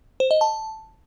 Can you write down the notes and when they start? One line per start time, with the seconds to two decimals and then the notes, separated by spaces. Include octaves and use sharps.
0.20 C5
0.31 D#5
0.41 A5